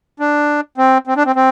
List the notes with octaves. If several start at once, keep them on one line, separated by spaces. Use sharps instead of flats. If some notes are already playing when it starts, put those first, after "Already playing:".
D4
C4
C4
D4
C4
C4